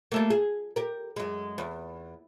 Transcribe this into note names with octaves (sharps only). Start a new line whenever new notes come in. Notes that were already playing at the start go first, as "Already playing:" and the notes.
G3 A3 A#3
G#4
G4 A#4
F#2 G#3
E2